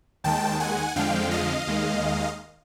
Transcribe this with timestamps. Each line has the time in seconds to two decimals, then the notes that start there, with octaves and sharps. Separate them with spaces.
0.24 D#2 D#3 G#3 G5 A5
0.60 F#5 G#5
0.96 F2 D3 F3 G#3 F5 G5
1.31 D#5 F5
1.67 D#2 D#3 G#3